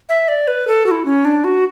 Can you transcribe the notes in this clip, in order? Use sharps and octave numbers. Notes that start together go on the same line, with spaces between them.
E5
D5
B4
A4
F#4
E4
C#4
D4
F#4